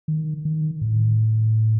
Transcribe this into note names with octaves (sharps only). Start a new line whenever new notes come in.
D#3
D#3
A2